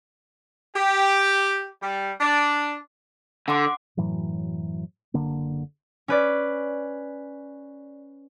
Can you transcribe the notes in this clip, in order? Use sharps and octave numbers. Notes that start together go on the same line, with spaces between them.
G4
G3
D4
D3 F#5 C6 D6
F#2 A2 E3 F#3
F#1 D3 A#3
C#4 B4 D5